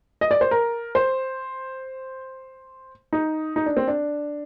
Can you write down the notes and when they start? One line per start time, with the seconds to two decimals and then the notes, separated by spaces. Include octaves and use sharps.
0.21 D#5
0.31 D5
0.41 C5
0.51 A#4
0.95 C5
3.13 D#4
3.56 D#4
3.66 D4
3.77 C4
3.88 D4